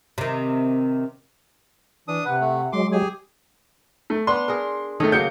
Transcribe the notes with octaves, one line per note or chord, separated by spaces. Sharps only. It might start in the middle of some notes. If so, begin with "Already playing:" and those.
C3 D#3
E3 D4 D#6
C3 B4 F#5
A3
F#3 G#3 C6 D6
G4 G#4 G#5 D#6
A3
B3 D4 C6
G#4 A#4
D#3 A3 A4 C#5 D#5
C#3 F#3 A#3 G6 C#7